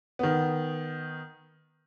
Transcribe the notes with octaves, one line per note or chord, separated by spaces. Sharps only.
D#3 B3